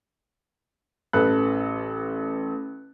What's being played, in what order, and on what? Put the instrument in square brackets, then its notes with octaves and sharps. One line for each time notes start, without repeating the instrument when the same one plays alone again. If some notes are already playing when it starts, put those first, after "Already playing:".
[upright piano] A1 A4 B4 F#6